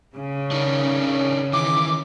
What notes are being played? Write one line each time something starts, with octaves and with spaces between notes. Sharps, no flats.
C#3
D4 D#4 A#4
D#3 E3 D6